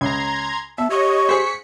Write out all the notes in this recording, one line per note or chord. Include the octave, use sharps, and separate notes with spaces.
C#2 A#5 C6 G#6
B3 E5 A5
G4 C#5 D#5 C#6
G#4 C5 B6 C#7